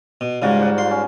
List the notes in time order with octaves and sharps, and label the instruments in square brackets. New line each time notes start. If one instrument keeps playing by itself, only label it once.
[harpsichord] B2
[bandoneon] G#2 G3 [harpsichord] C#3 G#3 [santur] F4 F#4
[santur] C5 D5 F#5
[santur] F4 [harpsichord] C6
[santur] C#4